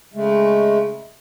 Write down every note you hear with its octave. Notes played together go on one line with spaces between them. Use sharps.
C#3 G#3 A3